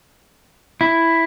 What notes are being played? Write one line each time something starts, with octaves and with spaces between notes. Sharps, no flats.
E4